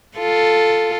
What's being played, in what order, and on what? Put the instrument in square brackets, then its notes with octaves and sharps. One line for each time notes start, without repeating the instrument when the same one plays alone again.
[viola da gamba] F4 A4